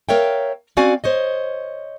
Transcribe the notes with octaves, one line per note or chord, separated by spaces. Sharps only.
A#4 C#5 E5 F5 G5
C4 C#4 F#4 D5 F5 G#5
C5 C#5 D#5